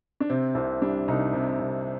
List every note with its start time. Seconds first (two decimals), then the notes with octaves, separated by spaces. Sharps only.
0.20 D4
0.30 C3 C4
0.55 C2 C4
0.82 G3 D4
1.08 C2 D#4
1.33 C3
1.60 C2